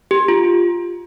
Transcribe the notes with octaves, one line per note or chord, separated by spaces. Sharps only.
G4
F4